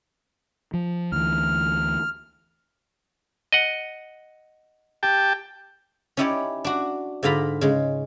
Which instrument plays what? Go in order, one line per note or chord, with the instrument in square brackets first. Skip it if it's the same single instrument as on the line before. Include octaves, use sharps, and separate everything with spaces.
[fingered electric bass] F3
[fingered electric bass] D2 E3 [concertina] F6
[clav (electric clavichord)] D#5 F#5
[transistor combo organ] G4 G5 A5
[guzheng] C#4 D#4 E4 G4 C#5 D5
D4 F#4
G#2 D3 F4 A#5 B5
C#3 G#3